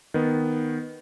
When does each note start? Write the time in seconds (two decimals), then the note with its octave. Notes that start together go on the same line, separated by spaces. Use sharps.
0.14 D#3 B3